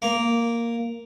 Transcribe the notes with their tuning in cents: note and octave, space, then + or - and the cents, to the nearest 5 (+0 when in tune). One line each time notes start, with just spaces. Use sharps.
A#3 +0 A#5 +0